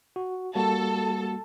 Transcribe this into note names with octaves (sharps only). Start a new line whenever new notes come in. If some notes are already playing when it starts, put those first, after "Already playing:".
F#4
G3 A#3 F#4 A4